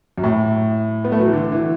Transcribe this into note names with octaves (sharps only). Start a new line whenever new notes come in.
F#2
A2
B3
A3
F#3
E3
D3
E3